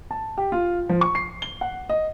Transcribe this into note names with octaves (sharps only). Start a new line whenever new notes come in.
A5
G4
F4
F3
C#6
C7
G7
F#5
D#5